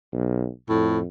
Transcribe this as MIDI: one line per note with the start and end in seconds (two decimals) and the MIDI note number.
0.13 0.48 35
0.69 1.07 41
0.69 0.99 45